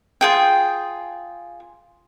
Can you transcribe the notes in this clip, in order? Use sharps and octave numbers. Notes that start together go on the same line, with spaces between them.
F4 G#4 G5